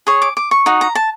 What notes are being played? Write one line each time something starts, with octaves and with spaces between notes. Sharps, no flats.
G#4 C#5
D6
D6
C#6
D#4 F#4
A#5
A5